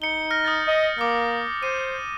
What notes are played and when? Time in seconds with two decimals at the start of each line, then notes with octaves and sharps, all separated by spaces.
0.02 D#4 C#7 G7
0.31 F6 A#6
0.45 D#6 G6 A6
0.67 D#5
0.99 A#3 D6 F6
1.63 C5 D#7